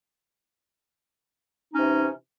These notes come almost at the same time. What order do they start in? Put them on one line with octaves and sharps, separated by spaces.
D#4 C#4 C3 E3